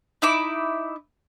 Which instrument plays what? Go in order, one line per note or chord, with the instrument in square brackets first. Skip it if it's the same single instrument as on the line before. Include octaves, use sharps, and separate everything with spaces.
[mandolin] D#4 E4 D6